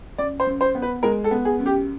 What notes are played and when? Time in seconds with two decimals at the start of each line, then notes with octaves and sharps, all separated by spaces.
0.18 F#2 D5
0.40 C5
0.47 F#2
0.61 C5
0.75 B3
0.82 B4
1.03 G#3 A#4
1.24 A4
1.31 B3
1.45 G#4
1.59 F#2
1.66 G4